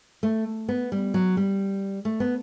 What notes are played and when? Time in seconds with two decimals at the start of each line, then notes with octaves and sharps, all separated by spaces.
0.23 A3
0.69 B3
0.92 G3
1.14 F#3
1.37 G3
2.05 A3
2.20 B3